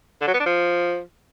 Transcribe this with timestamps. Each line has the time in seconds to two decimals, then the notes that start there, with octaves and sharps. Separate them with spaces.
0.21 D3
0.27 F#3
0.34 B3
0.40 D4
0.46 F3